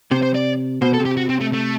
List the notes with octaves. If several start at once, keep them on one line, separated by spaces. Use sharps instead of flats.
C3 C5
C5
D5
B2 C5
A4
C3
G4
F#4
C4
A3
A3